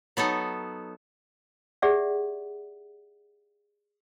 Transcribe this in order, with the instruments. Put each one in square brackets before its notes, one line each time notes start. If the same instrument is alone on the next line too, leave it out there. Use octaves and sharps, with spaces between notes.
[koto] F#3 B3 D#4 A4
[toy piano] G4 G#4 D5 E5 F#5